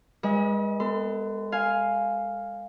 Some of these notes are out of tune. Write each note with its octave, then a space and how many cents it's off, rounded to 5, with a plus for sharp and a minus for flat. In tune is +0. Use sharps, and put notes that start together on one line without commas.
G#3 -30 B4 -35 D#5 +40
B3 +10 A4 +30 C6 -25
F5 +0 G#5 +0